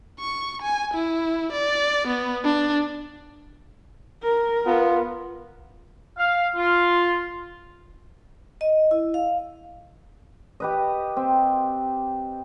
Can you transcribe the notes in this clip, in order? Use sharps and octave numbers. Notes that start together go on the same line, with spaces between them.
C#6
G#5
E4
D5
B3
D4
A#4
B3 F4
F5
F4
D#5
E4
F5
G4 B4 D#5
C4